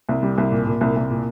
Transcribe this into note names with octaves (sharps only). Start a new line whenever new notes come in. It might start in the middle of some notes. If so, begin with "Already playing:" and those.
C2
G3
C2
A#2
A#2
C2
C2
A#2